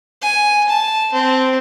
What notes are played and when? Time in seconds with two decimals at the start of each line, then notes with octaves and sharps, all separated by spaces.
0.22 G#5
0.69 A5
1.13 C4